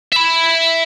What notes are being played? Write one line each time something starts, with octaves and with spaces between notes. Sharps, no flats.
E5 B5